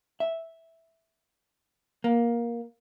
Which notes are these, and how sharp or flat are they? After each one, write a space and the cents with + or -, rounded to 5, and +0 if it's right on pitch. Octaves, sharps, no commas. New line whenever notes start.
E5 -5
A#3 +15